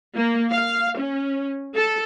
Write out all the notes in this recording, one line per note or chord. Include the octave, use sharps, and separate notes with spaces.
A#3
F5
C#4
A4